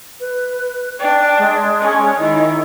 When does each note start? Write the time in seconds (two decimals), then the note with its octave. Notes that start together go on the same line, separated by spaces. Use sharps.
0.20 B4
1.00 D4 G5
1.39 G#3
1.81 C#4
2.19 D#3 E4